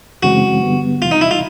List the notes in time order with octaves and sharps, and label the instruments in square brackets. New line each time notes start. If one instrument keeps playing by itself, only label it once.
[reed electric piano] F#2 C#3 E3 G#3 C4 [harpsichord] F#4
[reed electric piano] G2 D3 G3 B3
[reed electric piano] E2 C3 E3 [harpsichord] F4
[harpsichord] D#4
E4
F4